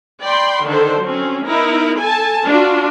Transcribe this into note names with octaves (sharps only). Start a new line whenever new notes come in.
D5 G5 B5 C6
D3 D#3 D4 A4 C5
F#3 C4 C#4
B3 D#4 E4 A#4
A4 G#5 A5
D4 F4 F#4